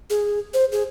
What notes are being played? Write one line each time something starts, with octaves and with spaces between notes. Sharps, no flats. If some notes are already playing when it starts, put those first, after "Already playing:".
G#4
C5
G#4